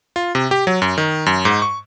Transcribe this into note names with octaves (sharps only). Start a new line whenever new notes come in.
F4
C3
G4
F#3
F#2
D#3
F#2
G#2
C#6